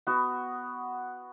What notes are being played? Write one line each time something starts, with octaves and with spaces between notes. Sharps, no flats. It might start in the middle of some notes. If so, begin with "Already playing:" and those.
B3 F#4